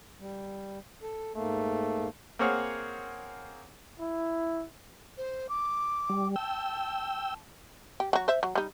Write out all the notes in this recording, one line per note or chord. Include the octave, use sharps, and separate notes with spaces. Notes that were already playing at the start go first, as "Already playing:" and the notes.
G3
A4
G#2 A3 A#3
A#3 C4 G#4 C#5 F#5 F6
E4
C5
D6
G3
G5 A5 E6
G4
F#3 F#4
C5 E5
F#3
G3 D#4